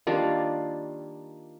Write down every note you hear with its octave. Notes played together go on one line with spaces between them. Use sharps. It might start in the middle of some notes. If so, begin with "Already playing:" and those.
D#3 G3 A#3 D4 F4